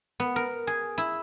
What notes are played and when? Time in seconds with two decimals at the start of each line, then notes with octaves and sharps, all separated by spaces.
0.20 B3
0.36 A#4
0.67 G#4
0.98 E4